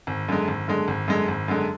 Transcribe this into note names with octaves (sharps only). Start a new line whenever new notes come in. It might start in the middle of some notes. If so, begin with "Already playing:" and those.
G#1
F#2 D3 G#3
G#1
F#2 D3 G#3
G#1
F#2 D3 G#3
G#1
F#2 D3 G#3